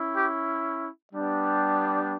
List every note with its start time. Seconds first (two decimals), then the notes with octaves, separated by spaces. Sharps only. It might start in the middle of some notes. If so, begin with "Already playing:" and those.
Already playing: C#4 E4
0.16 G4
1.13 G3 B3 D4 G4